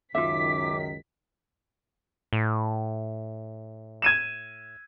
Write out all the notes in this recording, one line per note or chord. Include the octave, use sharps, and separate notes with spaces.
C#2 F#2 D#3 F4 E5 D6 B6
A2
G#6 D#7 E7